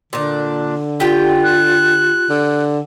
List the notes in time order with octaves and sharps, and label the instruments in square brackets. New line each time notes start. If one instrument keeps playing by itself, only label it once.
[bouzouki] A#2 D4 [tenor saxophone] D3
[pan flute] F4 [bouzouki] G4 G5
[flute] F#6
[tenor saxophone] D3